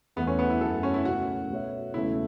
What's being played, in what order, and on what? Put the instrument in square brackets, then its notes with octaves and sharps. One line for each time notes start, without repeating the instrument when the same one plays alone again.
[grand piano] E2 E3 A3 [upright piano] B3
[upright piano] C#4
B3
E4
[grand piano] F#2 F#3 A3 [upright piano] A4
[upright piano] C#4
E4
[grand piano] C#2 B2 A3 C#4 [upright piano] F#4
[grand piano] B2 A3 F#4 C#5 E5
[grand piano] E1 E2 C#3 A3 [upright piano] E4